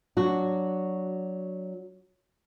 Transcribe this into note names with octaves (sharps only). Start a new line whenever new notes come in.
F#3 D4 F#4